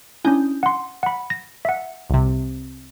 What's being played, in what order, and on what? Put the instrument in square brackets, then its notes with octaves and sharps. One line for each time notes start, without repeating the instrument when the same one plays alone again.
[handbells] C#4 D4 E4 [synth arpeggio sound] G#5 D#6 G6
[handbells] F#5 C6
F#5 B5
A#6
E5 F#5
[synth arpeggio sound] C2 C3